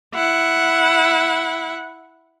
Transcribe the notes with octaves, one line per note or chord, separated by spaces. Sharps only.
E4 F#5